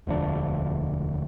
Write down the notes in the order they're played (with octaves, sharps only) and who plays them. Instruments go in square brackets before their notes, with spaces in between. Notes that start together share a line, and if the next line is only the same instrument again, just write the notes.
[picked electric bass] E1 D2 F3 D4